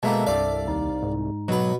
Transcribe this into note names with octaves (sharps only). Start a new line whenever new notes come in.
B2 G#3 A#3 B3 A4 E5 A5
C2 G2 D5 F5
D#2 D#4
G#2
B2 F#3 B4